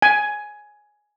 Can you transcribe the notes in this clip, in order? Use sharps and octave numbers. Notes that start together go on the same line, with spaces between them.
G#5